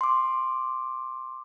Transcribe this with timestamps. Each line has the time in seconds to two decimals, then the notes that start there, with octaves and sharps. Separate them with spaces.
0.01 C6 D6